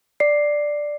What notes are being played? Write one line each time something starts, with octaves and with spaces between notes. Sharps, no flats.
D5 C7